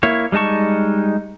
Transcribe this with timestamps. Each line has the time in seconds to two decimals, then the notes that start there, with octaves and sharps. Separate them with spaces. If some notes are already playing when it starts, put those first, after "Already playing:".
0.03 A#3 E4 C#5
0.32 G3 G#3 D#4 A5 C#6